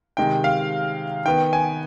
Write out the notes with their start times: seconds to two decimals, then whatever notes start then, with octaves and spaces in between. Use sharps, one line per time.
0.17 C3 D#3 G#3 G5
0.44 F5
1.25 D#3 B3 G5
1.53 G#5